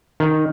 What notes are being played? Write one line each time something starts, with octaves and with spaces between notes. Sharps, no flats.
D#3